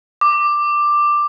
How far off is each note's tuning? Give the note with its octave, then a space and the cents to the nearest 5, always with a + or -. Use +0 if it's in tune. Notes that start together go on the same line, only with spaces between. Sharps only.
D6 +10